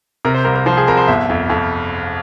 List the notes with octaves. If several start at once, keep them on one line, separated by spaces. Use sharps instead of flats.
C3 A#4
C5
C2 A#4
A#4
F3 C5
G#4
C2 A#4
C5
G1 E5
F2
F2